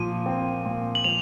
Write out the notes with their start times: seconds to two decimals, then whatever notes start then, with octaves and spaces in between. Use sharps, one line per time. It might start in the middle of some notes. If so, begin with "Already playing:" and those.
Already playing: A#2 F3 D#7
0.26 C4
0.66 A#2
0.95 F#7
1.04 F3 F7